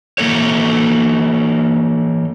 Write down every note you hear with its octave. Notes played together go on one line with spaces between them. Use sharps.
E3 A#3 A4 C#5